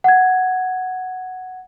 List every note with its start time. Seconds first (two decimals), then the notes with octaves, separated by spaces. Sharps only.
0.04 F#5 G#6